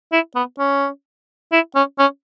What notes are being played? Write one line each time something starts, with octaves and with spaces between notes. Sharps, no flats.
E4
B3
C#4
E4
C#4
C#4